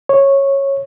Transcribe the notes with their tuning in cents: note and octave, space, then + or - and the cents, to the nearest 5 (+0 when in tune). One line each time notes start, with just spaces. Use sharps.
C#5 -10